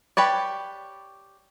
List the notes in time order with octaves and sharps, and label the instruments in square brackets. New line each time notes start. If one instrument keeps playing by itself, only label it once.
[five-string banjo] G4 B4 C#5 D5